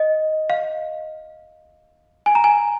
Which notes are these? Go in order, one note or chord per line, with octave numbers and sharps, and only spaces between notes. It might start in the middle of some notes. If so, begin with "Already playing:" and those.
Already playing: D#5
F5
G#5
A#5
G#5